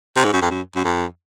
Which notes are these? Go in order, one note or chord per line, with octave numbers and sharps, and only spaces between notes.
C3
G#2
F#2
F2
F#2
F#2
F2